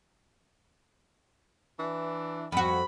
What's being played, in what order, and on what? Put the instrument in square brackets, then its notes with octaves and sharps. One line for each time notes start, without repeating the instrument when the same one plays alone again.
[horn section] E3 D4
[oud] F2 F#4 [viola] B5